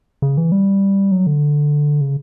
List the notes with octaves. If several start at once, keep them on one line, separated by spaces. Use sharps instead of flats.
C#3
E3
G3
F#3
D3
C#3